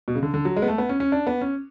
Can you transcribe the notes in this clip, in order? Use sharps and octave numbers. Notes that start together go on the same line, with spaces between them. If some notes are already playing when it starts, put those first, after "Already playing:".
B2
C#3
D3
D3
F#3
G#3
B3
A3
B3
C#4
C#4
D4
B3
C#4